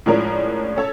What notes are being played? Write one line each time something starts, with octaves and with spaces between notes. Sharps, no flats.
A2 F3 G#3 C#4 D4 A#4
C#4 A4 C#5